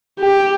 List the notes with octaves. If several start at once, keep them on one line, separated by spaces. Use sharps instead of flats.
G4